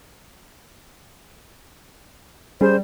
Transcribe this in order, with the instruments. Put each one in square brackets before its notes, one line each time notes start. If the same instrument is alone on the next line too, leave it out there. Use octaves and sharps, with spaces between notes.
[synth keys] G3 [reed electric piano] C#4 G#4 [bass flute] C5